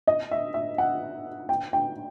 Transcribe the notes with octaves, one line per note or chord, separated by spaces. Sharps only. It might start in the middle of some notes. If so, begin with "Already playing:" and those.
D#5
E5
E5
F#5
G5
G5